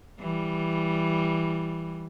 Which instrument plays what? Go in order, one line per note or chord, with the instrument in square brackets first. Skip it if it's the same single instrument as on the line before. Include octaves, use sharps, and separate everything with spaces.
[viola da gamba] E3 G3